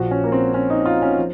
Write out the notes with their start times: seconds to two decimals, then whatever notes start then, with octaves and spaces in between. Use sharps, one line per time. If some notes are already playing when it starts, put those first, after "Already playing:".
Already playing: A#1 A#2 F3 F#4
0.11 C#4
0.24 A#3
0.32 C4
0.54 C#4
0.70 D#4
0.86 F4
1.02 C#4
1.18 F3